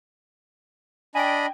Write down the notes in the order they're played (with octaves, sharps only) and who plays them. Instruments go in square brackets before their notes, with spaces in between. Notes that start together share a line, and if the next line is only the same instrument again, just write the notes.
[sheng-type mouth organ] D4 D#5 B5 [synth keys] G5 G#5